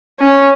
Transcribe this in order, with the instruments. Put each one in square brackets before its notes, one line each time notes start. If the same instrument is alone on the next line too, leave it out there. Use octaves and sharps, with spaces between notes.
[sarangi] C#4